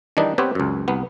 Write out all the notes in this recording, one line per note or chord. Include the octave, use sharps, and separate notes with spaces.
D#3 E3 G3 D4 D#4
B3 C4 G4 B4 C#5
C#2 F#2
C2 B3